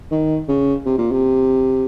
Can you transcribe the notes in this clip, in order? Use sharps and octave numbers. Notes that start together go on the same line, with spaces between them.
D#3
C#3
C3
A#2
C3